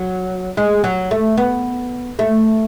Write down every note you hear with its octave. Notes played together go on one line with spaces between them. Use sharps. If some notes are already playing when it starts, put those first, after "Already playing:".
Already playing: F#3
G#3
F#3
A3
B3
A3